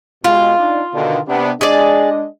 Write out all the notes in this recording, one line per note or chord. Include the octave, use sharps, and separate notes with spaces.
B2 G#3 F4 G4
D4 D#4
B2 D3 D#3
C3 B3 D4
G#3 D4 G#4 D5 D#5